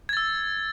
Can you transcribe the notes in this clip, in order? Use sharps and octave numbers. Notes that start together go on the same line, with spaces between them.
E6 G#6 A6